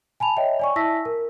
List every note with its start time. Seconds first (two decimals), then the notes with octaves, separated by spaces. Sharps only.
0.20 G#5 A5 B5 F7
0.37 C#5 D#5 E5 G5
0.59 D5 G#5 C#6
0.76 E4 E5 A5 E6 A#6 B6
1.05 A#4